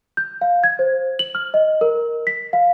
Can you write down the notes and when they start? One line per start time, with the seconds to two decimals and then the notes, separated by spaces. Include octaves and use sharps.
0.17 G6
0.41 F5
0.64 G#6
0.79 C5
1.19 F#7
1.35 F6
1.54 D#5
1.81 A#4
2.27 B6
2.53 F5